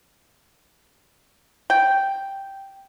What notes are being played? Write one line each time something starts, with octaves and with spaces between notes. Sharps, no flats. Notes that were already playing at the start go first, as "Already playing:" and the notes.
G5